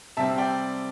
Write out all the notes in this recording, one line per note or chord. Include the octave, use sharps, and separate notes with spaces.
C3 G3 C4 E5 A5
D5 G5